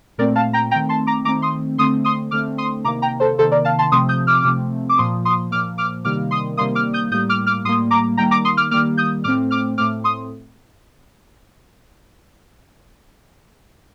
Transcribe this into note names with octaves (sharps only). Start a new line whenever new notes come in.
A#2 A3 C4 A#4 D5
F5 A5
G5 A#5
D#3 A3 C4 G5 A#5
A5 C6
A#5 D6
D#3 A3 C4 A#5 D6
C6 D#6
D3 A3 C4 C6 D#6
C6 D#6
D3 A3 C4 D6 F6
C6 D#6
C3 D#3 A#3 A#5 D6
G5 A#5
A4 C5
C3 D#3 A#3 A4 C5
A#4 D5
F5 A5
A5 C6
C3 F3 A3 C4 C6 D#6
D#6 G6
D6 F6
C3 F3 A3 C4
D6
A#2 F3 A#3 C6 D#6
C6 D#6
A#2 F3 A#3 D6 F6
D6 F6
C3 D#3 G3 A#3 D6 F6
C6 D#6
C3 D#3 G3 A#3 C6 D#6
D6 F6
D#6 G6
A2 G3 A#3 D#6 G6
D6 F6
D6 F6
A2 G3 A#3 C6 D#6
A#5 D6
D#3 G3 A#3 G5 A#5
A#5 D6
C6 D#6
D6 F6
D#3 G3 A#3 D6 F6
D#6 G6
A2 A3 C4 D6 F6
D6 F6
A2 A3 C4 D6 F6
C6 D#6